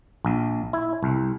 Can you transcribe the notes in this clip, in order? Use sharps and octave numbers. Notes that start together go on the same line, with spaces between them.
A#1
E4
C2